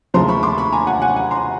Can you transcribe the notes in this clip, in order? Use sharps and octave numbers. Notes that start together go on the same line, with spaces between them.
D#2 C#3 F3 A3 A#5 C6
B5 C#6
C6 D6
B5 C#6
G#5 A#5
F#5 G#5
F#5 G#5
F#5 G#5
A#5 C6